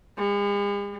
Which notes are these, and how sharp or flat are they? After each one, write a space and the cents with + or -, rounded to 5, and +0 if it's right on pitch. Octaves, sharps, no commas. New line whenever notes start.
G#3 -45